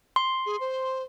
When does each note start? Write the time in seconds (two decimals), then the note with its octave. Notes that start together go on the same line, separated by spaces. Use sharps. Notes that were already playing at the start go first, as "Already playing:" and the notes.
0.16 C6
0.46 G#4
0.60 C5